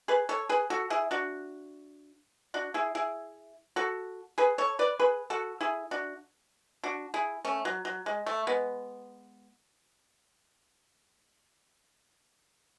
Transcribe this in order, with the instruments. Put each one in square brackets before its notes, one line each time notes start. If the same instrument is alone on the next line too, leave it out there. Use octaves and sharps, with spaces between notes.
[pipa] G#4 B4
A4 C#5
G#4 B4
F#4 A4
E4 G#4
D4 F#4
D4 F#4
E4 G#4
E4 G#4
F#4 A4
G#4 B4
A4 C#5
B4 D5
G#4 B4
F#4 A4
E4 G#4
D4 F#4
D4 F#4
E4 G#4
A3 C#4
F#3
F#3
G#3
A3
G#3 B3